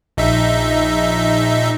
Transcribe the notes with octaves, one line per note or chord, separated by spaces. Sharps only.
A#1 D#4 E5